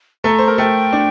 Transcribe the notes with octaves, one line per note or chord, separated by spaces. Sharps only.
A3 A4 A#5
C5
A#4
A3 A4 G5
D4